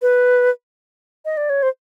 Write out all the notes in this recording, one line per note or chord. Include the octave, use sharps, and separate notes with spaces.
B4
D#5
D5
C#5
C5